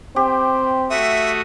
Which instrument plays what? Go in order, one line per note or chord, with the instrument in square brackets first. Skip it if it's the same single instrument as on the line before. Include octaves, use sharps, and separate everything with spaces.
[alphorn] C4 [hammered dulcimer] G4
[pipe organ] A3 F#4 D#6 [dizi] E5